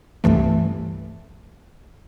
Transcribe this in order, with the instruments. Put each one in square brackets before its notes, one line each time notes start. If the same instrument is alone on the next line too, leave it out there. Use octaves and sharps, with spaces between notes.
[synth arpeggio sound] C2 G2 E3 A3